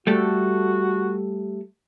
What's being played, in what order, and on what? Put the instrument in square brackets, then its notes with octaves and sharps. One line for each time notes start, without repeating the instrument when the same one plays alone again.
[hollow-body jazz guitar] G3 A3 A4 [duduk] F#4